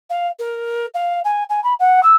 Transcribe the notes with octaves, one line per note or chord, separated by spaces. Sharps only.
F5
A#4
F5
G#5
G#5
B5
F#5
E6